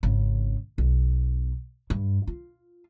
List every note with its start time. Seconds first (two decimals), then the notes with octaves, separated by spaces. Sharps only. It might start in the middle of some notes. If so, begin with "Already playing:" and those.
0.03 G#1 C#3
0.78 B1
1.90 G2
2.27 F4